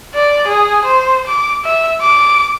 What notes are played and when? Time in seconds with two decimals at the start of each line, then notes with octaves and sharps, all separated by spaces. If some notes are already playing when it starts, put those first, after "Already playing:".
0.14 D5
0.47 G#4
0.85 C5
1.27 D6
1.65 E5
2.01 D6